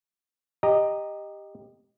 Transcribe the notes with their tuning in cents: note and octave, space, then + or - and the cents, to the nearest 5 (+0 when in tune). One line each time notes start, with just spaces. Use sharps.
G4 +15 D#5 -5 A#5 +0